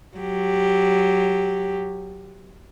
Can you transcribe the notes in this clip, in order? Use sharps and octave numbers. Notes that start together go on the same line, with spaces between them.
F#3 G4